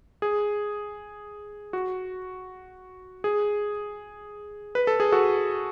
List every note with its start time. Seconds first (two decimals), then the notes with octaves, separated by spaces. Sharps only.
0.22 G#4
1.73 F#4
3.24 G#4
4.75 B4
4.87 A4
5.00 G#4
5.12 F#4 A4